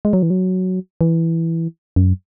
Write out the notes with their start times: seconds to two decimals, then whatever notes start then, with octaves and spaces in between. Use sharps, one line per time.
0.05 G#3
0.13 F#3
0.23 E3
0.30 F#3
1.01 E3
1.96 F#2